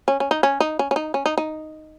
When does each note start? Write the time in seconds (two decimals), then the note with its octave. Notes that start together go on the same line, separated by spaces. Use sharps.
0.08 C#4
0.20 C#4
0.31 D#4
0.43 C#4
0.60 D#4
0.79 C#4
0.91 C#4
0.96 D#4
1.14 C#4
1.26 D#4
1.38 D#4